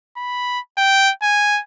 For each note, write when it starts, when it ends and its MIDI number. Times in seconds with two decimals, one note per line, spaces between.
0.17 0.60 83
0.78 1.11 79
1.23 1.61 80